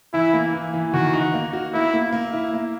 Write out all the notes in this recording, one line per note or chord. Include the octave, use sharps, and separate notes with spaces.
E3 E4
A#3
E3
E3
D#3 F#4
D#4
A#3
F#4
A#3 E4
A#3
A#3
E4
A#3